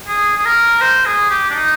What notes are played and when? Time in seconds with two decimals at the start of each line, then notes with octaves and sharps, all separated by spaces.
0.08 G#4
0.37 G#4
0.45 A#4
0.81 C5
1.05 G#4
1.30 G4
1.50 D4
1.54 D#4